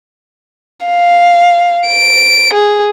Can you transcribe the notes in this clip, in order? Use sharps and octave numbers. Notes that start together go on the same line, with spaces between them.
F5
D7
G#4